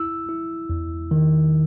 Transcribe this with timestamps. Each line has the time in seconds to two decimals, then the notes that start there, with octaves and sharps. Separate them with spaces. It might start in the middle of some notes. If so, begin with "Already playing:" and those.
Already playing: E4 E6
0.29 E4
0.70 E2
1.11 D#3